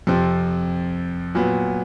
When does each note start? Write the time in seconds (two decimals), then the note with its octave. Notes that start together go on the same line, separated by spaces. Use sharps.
0.07 F2 C3 F3
1.35 A#2 F#3 B3